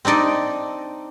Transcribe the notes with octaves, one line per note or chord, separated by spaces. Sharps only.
C4 D4 D#4 D5 D#5